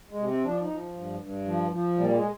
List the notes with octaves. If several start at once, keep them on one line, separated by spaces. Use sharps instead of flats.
G#3
C3
C4
F3 D4
D#4
F3
G2
G2
F3
F3
A#2 G3
G#3